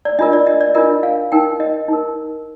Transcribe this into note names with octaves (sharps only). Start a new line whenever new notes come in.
D5
D4 F4 A#4 D#5
D5
D#5
D5
D4 F4 A#4 D#5
F5
D#4 A#4 G5
D#5
D#4 A#4